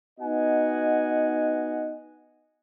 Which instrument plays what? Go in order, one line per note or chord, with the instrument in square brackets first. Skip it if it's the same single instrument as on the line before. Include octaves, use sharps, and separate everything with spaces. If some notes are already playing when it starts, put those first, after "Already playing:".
[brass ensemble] B3 D#4 F#4 D#5 F#5 G#5